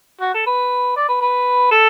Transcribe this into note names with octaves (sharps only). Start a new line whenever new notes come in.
F#4
A4
B4
D5
B4
B4
A4